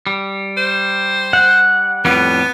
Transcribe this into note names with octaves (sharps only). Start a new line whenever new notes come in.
G3
C5
F#5
F2 A2 G3 B3